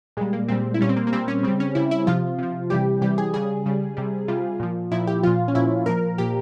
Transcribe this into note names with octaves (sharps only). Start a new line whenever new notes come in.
A#2 G3 G#3
A#3
A#2 G3 C4
E4
A#2 G3 C#4
C4
A#3
A#3
A#2 G3 C4
C#4
C#3 G3 C4
C#4
C#3 G3 E4
E4
C3 F3 F4
C3 F3
C3 E3 G3 G4
C3 E3 G3 G4
G#4
C#3 G3 G#4
C#3 G3
C3 G3
C3 G3 F4
A#2 F3
A#2 F3 E4
G4
A#2 F3 F4
C#4
A#2 F3 E4
A#2 F3 A#4
A#2 F3 G4